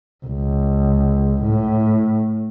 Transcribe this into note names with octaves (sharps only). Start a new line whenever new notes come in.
C#2
A2